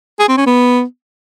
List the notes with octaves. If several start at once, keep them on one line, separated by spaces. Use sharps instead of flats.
G#4
C4
C#4
B3